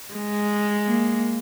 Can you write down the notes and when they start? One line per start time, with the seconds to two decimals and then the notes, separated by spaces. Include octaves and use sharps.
0.15 G#3
0.86 A#3